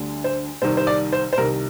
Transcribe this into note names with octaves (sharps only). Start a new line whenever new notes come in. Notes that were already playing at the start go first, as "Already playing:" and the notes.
Already playing: D2 D3 G3
C5
C2 C3 D#3 G3 C5
C5
D5
C5
C5
C2 C3 D#3 A#4